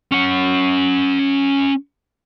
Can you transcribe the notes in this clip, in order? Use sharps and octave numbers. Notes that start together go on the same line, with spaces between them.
C#4 F#5